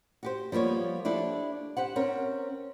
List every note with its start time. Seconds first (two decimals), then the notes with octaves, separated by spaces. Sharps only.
0.23 F#4 G4 C5
0.52 F3 G3 A#3 B3 C#5
1.05 D4 E4 G4 A4
1.77 G4 C5 F#5
1.96 C4 C#4 A#4